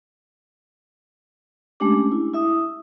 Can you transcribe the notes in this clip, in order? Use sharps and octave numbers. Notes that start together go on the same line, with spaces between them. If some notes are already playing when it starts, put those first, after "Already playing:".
G#3 A3 C#4 D4 G4 D6
E4
E4 E5 D#6